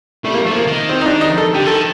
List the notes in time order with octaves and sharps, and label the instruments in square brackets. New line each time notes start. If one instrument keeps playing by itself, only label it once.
[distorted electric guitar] G3 [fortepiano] A3
[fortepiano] A#3
[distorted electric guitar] F3 [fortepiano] A3
[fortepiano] A#3
[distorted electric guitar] D#3
[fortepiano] C4
D#4
D4
D#4
A4
[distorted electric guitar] D3 [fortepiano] G4
[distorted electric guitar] D#3 F3 [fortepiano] A4